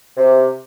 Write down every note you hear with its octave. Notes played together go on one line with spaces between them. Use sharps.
C3